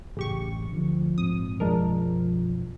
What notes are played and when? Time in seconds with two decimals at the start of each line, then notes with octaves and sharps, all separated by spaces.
0.17 A1 F#2 C#3 G4 C#6
0.72 D2 D3 F3
1.18 A#1 G#2 C4 D#6
1.60 B1 F#2 F3 G#3 D4 A#4